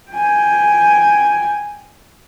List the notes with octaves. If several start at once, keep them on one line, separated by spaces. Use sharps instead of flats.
G5 G#5